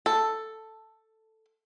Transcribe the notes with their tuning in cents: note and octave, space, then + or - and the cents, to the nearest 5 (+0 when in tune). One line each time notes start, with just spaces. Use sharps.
A4 +5